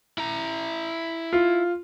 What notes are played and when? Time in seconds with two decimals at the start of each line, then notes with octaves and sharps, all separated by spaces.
0.18 E4 A#5
1.33 F4